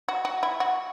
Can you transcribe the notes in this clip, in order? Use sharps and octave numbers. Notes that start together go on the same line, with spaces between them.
F#4
F#4
E4
F#4